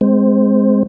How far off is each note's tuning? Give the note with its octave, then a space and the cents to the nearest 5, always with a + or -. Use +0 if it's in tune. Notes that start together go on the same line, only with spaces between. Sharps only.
G#3 +0 C4 -10 C5 +0